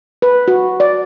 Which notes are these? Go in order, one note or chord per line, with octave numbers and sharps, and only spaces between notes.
B4
F#4
D5